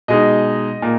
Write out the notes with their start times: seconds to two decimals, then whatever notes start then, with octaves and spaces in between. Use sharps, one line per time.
0.08 B2 G#3 D#4 D#5
0.82 A#2 A#3